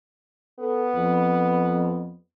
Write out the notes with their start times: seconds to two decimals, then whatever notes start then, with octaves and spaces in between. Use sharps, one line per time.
0.60 B3 A4
0.95 F2